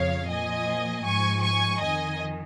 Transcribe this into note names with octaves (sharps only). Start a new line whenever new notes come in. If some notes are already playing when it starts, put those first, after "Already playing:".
Already playing: F2 C#3 F3 C#5 F5
A#2 F3 D#5 G#5
G#2 F3 G#5 C#6
G#5 C#6
F2 D#3 D#5 G#5